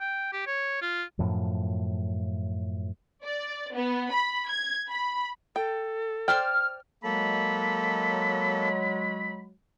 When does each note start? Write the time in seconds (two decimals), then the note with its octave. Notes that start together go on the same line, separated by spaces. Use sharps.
0.01 G5
0.33 G4
0.47 C#5
0.82 F4
1.19 F#2 A2 F3
3.24 D5
3.74 B3
4.11 B5
4.50 G#6
4.89 B5
5.56 A4 G5
6.28 C5 D5 G5 F6
7.04 F#3 G#3 A#3 A4 B5